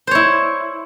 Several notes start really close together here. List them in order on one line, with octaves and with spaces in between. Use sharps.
C5 C#5 E4